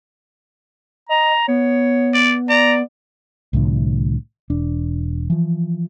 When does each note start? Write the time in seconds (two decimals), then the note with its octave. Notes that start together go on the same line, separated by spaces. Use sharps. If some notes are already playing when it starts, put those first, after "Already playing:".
1.09 D#5 A#5
1.48 B3 C#5
2.14 D5
2.49 D5 A#5
3.53 C2 A2 D3 F3
4.50 E1 D4
5.30 E3 F3